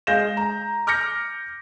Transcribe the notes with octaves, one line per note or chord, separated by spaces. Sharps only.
G#3 G#4 F5 G6 A#6 E7
A#5
D6 F6 G6 A#6 C#7